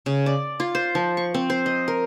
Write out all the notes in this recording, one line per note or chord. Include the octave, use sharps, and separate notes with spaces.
C#3
D5
F4
C5
F3
C#6
C4
C5
D#5
A#4